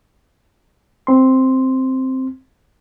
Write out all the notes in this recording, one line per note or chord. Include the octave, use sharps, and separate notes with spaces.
C4 C6